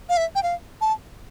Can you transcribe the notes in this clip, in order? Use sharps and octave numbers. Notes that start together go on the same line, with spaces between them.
F5
E5
G5
F5
A5